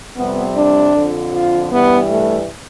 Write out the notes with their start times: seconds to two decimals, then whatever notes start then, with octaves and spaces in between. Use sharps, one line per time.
0.17 F2 C3 G3 B3
0.56 D4
0.94 F2 D3 F3
1.33 F4
1.71 G2 E3 G3 B3
2.08 A3